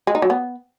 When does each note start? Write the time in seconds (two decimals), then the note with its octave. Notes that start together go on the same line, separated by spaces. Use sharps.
0.07 G#3
0.15 D#4
0.22 F#3
0.30 B3